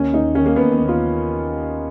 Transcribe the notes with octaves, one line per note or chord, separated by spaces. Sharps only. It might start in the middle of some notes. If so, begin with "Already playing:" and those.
Already playing: D#2 C#4
D#2 D#4
D#3 C#4
A#3
D#2 B3
B3
D#2
F4